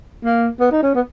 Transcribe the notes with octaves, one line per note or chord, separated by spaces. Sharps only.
A#3
B3
D#4
C#4
B3